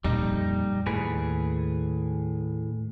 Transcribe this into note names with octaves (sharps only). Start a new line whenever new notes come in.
F2 A#2 G3 D#4
D#2 A2 G#4 B4